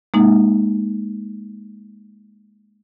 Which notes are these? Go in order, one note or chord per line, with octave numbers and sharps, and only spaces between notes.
G#3 A#3 D#4